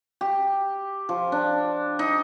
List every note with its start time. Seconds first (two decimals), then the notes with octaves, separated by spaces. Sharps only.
0.21 G4
1.09 F3
1.32 D4
1.99 D#4